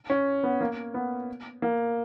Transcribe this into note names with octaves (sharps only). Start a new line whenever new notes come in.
C#4
B3
A#3
B3
A#3